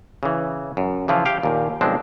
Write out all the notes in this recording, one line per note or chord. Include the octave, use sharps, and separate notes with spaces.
C#3 E3
F#2
C#3 E3 F3 E4 F4
G4 F5 G5
D#2 A#2
B1 F3 G#3 C4 D4